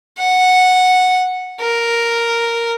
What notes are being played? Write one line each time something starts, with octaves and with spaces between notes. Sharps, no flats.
F#5
A#4